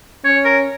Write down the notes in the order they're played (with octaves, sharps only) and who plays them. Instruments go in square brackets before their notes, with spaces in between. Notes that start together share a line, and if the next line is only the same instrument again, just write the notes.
[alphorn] C#4 [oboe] C#5
[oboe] A#4